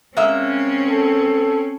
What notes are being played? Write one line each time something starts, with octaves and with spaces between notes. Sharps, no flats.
G#3 A#3 C4 C#4 E5
A4